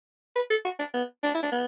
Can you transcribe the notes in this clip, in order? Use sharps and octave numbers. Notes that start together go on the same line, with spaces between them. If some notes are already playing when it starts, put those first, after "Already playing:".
B4
A4
F#4
D4
B3
D4
E4
D4
B3